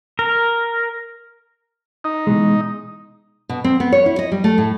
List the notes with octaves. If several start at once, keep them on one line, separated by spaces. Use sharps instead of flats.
A#4
D#4
B2 E3 G#3
B2
C4
B3
C#5
E4
D#5
G3
A3
A2